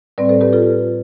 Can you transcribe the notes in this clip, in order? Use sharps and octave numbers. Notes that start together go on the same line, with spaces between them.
A2 G3 C4 B4 D5
A4 C5
G4 B4
F4 A4